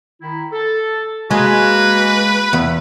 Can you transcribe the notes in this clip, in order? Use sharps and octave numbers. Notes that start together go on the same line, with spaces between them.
D#3 E4
A4
G#3 A#3 F#4 B4
E2